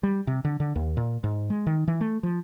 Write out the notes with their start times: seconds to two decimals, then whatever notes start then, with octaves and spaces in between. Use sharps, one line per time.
0.03 G3
0.27 C3
0.45 D3
0.60 D3
0.76 D#2
0.97 A#2
1.24 G#2
1.50 G#3
1.67 D#3
1.88 E3
2.01 A3
2.23 F3